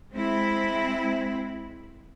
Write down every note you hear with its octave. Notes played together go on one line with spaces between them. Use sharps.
G#3 C4 E4